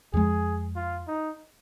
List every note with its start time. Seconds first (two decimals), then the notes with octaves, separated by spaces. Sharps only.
0.13 F2 F3 G#3 G#4
0.76 F4
1.07 D#4